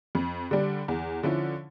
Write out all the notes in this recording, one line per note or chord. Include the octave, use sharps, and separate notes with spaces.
F2
D3 G3 D4
E2
D3 F3 C#4 E4